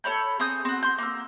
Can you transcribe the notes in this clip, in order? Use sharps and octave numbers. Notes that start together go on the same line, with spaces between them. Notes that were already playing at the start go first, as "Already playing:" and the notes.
A4 C#5 B5 G6
C4 G#4 D#6 G6
C4 F#4
C6 G6
A#3 E6